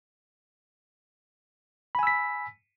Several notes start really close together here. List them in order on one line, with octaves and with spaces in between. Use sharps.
B5 G#5 E6 B6